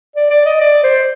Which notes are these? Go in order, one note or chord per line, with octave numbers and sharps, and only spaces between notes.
D5
D5
D#5
D5
C5